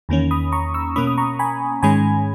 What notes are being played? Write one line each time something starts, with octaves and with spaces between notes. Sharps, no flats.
E2 D#3 A#3 C#4
B5 D#6
A#5 C#6
C#6 E6
B2 A#3 C#4 B5 D#6
D#6
A#5 C#6
G#5 B5
G#2 D#3 G#3 C#4 G#5 B5